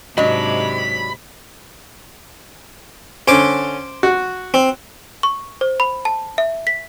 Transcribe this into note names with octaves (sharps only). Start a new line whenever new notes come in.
G#2 C3 F#3 D4 G4 D#5 B5
D3 C#4 C5 D6
F#4
C4
C#6
C5
B5
A5
E5
B6